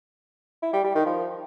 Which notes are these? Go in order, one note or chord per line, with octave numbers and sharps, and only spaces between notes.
E4
G3
G3
D#3
F3